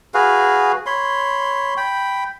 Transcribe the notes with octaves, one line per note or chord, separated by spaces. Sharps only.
F#4 G#4 B4 F5
C#5 B5 C6
G5 B5